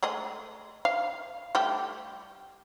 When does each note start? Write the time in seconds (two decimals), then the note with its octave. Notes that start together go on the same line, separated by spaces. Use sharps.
0.03 G#3 A3 D#5
0.85 F5
1.55 G3 A3 G4